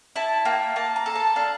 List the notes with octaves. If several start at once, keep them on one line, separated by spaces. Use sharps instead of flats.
E4 A5
A#3 G5
A#3 A5
A#5
A4
A5
D4 F5